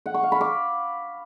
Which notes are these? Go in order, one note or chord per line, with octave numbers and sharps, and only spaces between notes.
F#5
C#6
F5
B5
D6